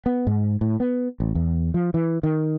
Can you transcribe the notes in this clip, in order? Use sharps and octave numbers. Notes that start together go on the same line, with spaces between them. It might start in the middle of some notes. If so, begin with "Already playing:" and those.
B3
G#2
A2
B3
A1
E2
F3
E3
D#3